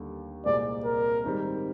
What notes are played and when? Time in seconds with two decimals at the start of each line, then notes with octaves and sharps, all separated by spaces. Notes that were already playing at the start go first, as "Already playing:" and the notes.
Already playing: D#2 D3 G3 A#3
0.45 C2 A#2 G#3 C4 D5
0.85 A#4
1.24 G#2 D#3 G3 C4